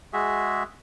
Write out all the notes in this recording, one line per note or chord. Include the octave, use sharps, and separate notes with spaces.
G#3 F#4 G#4 E5